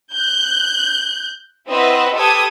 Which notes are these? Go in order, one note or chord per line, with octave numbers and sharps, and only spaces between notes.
F#6 G6
C4 E4 B4 D#5 E5 F#5
G4 A4 B4 D#6 G#6